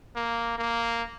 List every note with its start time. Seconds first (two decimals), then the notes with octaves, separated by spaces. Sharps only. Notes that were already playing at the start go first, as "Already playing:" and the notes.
0.16 A#3
0.58 A#3